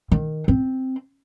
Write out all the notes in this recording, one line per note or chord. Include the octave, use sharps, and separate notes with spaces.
D#3
C4